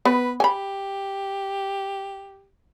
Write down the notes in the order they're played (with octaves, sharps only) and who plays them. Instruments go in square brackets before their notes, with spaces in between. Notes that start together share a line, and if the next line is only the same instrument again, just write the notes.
[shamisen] B3 [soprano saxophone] B4
[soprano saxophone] G4 [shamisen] G#5 B5